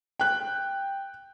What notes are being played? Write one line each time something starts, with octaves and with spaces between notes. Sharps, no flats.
G5 F#6